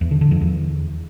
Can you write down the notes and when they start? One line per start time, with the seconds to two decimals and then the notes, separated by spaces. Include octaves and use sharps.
0.01 E2
0.11 D3
0.21 D3
0.31 F2
0.41 E2